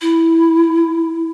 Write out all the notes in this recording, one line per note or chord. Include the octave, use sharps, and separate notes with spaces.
E4